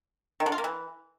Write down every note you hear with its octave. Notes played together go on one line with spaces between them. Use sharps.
D#3
D3
F4
A#3
E3